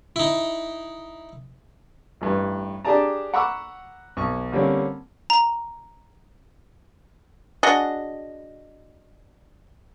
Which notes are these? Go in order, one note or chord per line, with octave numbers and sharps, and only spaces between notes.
D#4 E4
A1 G2
D4 G4 G#4 D5 A5 A#5
F#5 A#5 B5 C#6 D6 E6
B1 C#6
D3 G3 A#3 C4 C#4
A#5
D4 F#4 G#4 D#5